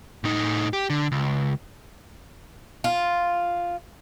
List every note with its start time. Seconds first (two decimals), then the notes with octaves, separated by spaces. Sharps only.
0.24 A2 D#4
0.73 G4
0.90 D3
1.12 C#2
2.84 F4